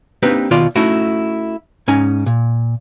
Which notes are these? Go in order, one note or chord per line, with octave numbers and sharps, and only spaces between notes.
A#3 C4 D4 D#4 G4 B4
D#2 B2 D#3 F4 D5 C6
A3 C#4 D#4 E4 F#4
G#2 C#4 D#4 G#5
A#2